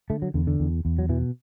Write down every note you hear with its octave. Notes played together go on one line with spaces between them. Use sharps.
D3 A3
F#3
E2 D3
D3
E2
E2
F#3
B2 E3